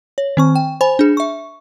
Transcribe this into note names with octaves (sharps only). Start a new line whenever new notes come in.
C#5
D#3 C4 C#6
G5
C5 G#5 B5
D4 G#4
E5 C#6